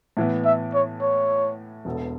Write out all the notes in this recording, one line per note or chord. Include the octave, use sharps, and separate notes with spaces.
A2 E3 B3
E5
C#5
C#5
E1 E2 B2 B3 A4